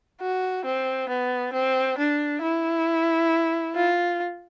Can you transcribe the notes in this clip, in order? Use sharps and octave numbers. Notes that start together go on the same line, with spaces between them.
F#4
C4
B3
C4
D4
E4
F4